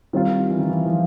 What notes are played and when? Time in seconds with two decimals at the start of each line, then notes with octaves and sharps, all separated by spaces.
0.13 D#3 G3 C4 F4
0.50 E3
0.59 D#3
0.70 E3
0.86 F3